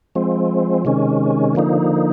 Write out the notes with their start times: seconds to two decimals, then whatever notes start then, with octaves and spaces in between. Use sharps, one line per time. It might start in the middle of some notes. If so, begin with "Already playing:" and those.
0.15 F3 G#3 C4
0.85 C3 D#3 G#3 C#4
1.55 D3 F3 A#3 D#4